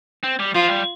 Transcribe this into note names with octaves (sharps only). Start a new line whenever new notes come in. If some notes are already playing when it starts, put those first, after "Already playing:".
C4
G3
F3 F4
G3